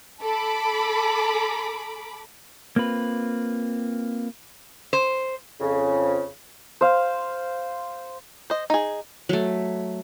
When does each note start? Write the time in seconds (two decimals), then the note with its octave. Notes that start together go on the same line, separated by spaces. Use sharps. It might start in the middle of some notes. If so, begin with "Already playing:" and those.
0.21 A4 B5 D6
2.76 A#3 C4 F4 B4
4.93 C5
5.60 F2 C#3
6.81 C5 F5
8.50 C5 D#5
8.70 D#4 G#4
9.29 F#3 A3